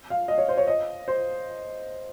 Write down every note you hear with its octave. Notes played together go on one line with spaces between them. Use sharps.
F5
D#5
C#5
C5
C#5
D#5
C5